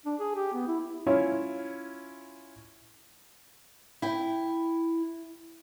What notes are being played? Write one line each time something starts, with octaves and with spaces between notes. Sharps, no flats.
D4
G#4
G4
B3
E4
C#4 E4 F4 C#5
E4 G5